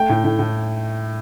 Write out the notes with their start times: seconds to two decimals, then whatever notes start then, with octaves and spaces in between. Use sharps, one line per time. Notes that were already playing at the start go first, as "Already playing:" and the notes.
Already playing: A3 G5
0.09 A2
0.24 A2
0.39 A2